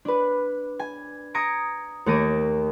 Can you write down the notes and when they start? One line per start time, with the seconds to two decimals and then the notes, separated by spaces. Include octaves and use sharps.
0.05 D4 B4
0.79 G#5
1.34 A#5 D#6 G#6 A#6 C#7 D7
2.06 D#2 A3 A#3 A#6 D7 D#7